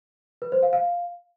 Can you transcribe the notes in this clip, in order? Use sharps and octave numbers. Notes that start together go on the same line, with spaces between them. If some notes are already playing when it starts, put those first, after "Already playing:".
B4
C5
F5
F5